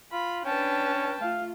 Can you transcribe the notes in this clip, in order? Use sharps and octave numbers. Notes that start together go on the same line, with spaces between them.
F4 B5
C#4 D4 B4 G5 A5
A3 F4 F5